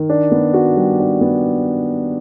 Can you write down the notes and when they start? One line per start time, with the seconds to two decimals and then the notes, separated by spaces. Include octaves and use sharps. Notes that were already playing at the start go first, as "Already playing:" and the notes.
Already playing: D#3
0.09 D4
0.31 B3
0.54 F#4
0.76 G3
0.99 D4
1.21 B3